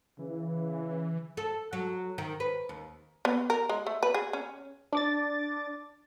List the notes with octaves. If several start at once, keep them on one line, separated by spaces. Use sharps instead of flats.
C#3 E3
A4
F#3
D#3
B4
D#2
B3
A#4
G#3
A3
B4
G#4
C#4
D4 D6 A6